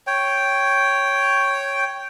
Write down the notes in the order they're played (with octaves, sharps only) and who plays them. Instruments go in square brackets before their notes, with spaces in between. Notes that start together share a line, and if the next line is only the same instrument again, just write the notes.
[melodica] C#5 G5